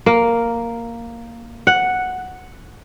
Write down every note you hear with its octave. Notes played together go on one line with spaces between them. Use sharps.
A#3
F#5